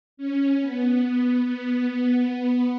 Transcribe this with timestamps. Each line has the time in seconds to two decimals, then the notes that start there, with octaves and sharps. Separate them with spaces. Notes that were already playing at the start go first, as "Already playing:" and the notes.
0.17 C#4
0.60 B3
1.44 B3